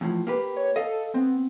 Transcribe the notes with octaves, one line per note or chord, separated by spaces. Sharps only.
E2 A2 F3
A#3 G4 B4
C#5
A4 D#5 F5
B3 C4